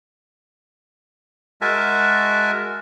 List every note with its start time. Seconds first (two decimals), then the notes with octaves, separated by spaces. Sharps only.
1.61 G#3 F#4 A#4 E5 G#5 A5